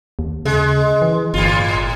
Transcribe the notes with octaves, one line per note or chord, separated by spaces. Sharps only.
D#2
C#3 G#3
E3
G1 A2 F4